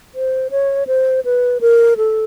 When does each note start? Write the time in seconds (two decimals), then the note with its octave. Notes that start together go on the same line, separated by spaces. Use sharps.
0.15 C5
0.51 C#5
0.87 C5
1.25 B4
1.61 A#4
1.97 A4